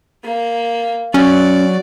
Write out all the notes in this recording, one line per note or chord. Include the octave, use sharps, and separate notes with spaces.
A#3
F#3 C#4 D5